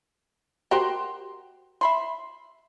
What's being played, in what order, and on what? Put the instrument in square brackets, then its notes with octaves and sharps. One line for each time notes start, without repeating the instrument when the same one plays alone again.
[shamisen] F#4 G4 [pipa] A#4 C5 C6
[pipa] E5 B5 C6